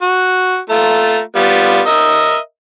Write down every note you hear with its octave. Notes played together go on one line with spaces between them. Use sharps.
F#4
A3 F4 A#5
G3 B3 F4
A#4 D#5 E5